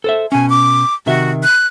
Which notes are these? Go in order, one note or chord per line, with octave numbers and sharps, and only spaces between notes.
A4 C5 E5
B2 C#4 G#5
D6
C3 D#3 F#4 E5
F#6